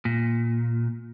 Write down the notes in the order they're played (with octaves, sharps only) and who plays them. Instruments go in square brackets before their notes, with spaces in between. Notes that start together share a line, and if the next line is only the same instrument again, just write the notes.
[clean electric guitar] A#2